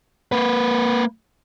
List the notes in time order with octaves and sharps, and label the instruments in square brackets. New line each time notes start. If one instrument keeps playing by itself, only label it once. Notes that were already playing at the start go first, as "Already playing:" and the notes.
[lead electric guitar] A#3 B4